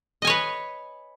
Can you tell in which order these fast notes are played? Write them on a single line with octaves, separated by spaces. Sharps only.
D#5 G#5 C#5 B4